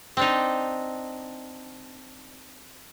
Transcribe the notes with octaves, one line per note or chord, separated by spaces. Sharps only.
C4 D4 D#4